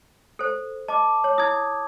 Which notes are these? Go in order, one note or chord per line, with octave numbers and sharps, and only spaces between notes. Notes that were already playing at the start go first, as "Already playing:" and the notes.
A4 C5
D#5 A5 D6
C#5
E4 D#6 G#6